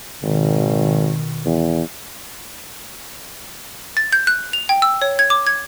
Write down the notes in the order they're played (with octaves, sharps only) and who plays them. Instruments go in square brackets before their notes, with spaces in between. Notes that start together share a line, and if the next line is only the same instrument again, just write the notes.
[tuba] G#1 [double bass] B2 D#3
[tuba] E2
[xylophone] A6
G6
F#6
F7
G5
E6
C#5
G#6
D6
G#6